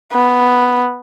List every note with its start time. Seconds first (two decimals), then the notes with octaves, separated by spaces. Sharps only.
0.13 B3